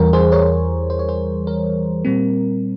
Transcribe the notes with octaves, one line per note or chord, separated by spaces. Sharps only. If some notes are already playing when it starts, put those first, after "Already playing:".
Already playing: E2 E3 G3 A#4
G#4 C5
A#4 C#5
C5
C#5
G#4 C5
A#4
A#2 G3 C4